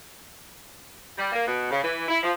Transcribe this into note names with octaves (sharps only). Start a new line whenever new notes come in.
G3
A#3
B2
C#3
E3
E4
F3